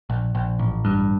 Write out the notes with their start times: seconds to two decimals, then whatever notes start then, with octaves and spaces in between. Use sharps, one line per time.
0.10 A#1
0.35 A#1
0.59 A1
0.85 G2